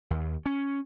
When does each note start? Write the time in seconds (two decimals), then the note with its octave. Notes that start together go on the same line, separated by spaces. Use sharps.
0.10 D#2
0.46 C#4